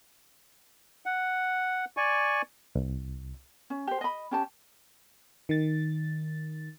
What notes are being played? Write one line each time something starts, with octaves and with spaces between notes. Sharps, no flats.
F#5
D5 G#5 C#6
C2
C#4
G4 C5
D#5 B5
C#4 G4 A5
D#3 A6